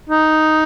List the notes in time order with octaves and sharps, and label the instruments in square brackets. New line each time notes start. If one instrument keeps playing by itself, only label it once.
[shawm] D#4